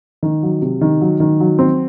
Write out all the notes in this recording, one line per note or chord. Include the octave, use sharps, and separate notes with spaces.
D#3
F#3
C3
D#3
F#3
D#3
F#3
C4